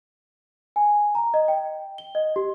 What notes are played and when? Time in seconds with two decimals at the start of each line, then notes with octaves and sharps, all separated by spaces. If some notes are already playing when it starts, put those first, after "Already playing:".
0.76 G#5
1.15 A#5
1.34 D#5
1.48 G5
1.98 G7
2.15 D#5
2.36 G4